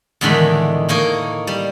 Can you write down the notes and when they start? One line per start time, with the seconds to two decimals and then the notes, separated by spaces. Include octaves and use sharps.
0.21 E2 A2 D3 D#3 G#3 B5
0.89 A2 A#3 D#4 A#4 C#5
1.47 G3